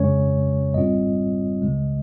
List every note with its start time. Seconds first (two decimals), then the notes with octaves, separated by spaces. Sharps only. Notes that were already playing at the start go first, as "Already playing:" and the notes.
Already playing: F2 C#3 G#3 C#4 C#5
0.74 G#1 G#2 G3 C4 F4 D#5
1.62 C#2 C#3 G#3